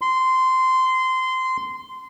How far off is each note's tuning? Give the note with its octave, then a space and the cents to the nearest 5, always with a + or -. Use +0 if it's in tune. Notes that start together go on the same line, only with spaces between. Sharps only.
C6 -15